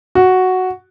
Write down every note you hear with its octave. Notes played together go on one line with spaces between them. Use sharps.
F#4